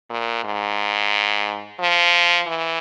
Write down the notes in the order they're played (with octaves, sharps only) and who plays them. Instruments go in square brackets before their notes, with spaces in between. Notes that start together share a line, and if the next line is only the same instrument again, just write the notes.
[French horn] A#2
G#2
F3
E3